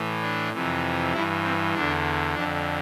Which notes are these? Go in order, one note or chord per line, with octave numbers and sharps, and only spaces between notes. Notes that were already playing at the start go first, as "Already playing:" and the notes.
Already playing: A2 E3
D4
F2 C3 E3
G2 E3 E4
C4
E2 D3 D4
F2 D3 D4